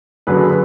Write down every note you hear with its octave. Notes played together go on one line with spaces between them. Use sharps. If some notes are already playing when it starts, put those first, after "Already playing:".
F#2 D3 F#3 G#4 B4
B4